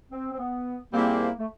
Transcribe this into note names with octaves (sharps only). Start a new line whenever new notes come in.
C4
C4
B3
A#2 G3 A#3 C4 E4 G#4
A3